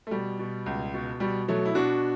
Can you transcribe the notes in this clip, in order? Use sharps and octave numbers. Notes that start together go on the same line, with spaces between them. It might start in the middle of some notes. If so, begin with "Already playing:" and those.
A3
B2 G3
B2
C#2
B2
B2 G3
B2 F#3 A3
E4
B2 D4 F#4